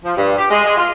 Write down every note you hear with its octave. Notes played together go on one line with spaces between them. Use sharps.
F3
G2
G4
G#3
G#3
F4